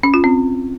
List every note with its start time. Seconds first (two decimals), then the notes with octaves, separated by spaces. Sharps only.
0.03 C#4
0.14 F4
0.24 C4